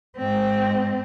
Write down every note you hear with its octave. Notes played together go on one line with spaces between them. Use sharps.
G#2 C4